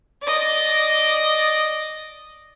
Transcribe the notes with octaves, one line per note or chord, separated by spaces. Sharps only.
D5 D#5